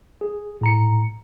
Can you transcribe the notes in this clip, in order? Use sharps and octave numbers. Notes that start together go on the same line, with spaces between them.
G#4
A2 A#5 C#7